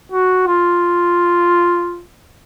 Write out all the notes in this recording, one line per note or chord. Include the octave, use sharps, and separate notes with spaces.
F#4
F4